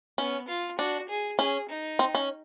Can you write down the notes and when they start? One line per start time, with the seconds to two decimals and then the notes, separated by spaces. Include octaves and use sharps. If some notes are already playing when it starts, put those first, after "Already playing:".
0.18 B3 C#4
0.48 F4
0.79 D4 F#4
1.09 G#4
1.39 C#4 G#4
1.69 D#4
1.99 C4
2.15 C#4